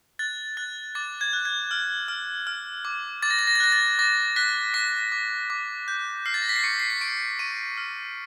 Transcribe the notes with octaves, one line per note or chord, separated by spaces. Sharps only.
F#6 A6
F#6 A6
D6 A6
G#6
F#6
G#6
F6
F6
F6
D6
D6 A6
A#6
A6
A#6
A6
F#6 A#6
A6
D6 A#6
F#6 B6
D6 B6
D6
D6
G6
F6 C7
A6
A#6
B6
C7
C#6 C#7
C7
C#7
C#6 D7
C#6 D#7
F6